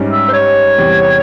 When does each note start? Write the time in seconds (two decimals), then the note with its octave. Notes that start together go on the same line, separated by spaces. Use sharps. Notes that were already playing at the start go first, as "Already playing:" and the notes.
Already playing: G#2 G3 C#4
0.10 E5
0.28 C5
0.33 C#5
0.78 E2 C3 G3